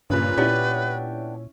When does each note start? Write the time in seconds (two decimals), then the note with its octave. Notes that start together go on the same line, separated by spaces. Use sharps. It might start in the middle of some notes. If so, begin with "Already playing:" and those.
0.10 G2 A#2 C#3 B4
0.37 A#2 B3 C#4 D4 E4 G4